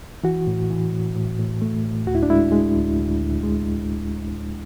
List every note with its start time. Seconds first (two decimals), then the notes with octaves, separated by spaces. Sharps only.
0.24 E3 F#4
0.47 A2
0.70 E3
0.92 A2
1.15 A2
1.39 A2
1.62 A3
1.84 A2
2.06 D2 F#4
2.15 E4
2.23 D4
2.30 G#3 E4
2.52 G#3
2.76 D2
2.99 D2
3.21 D2
3.43 G#3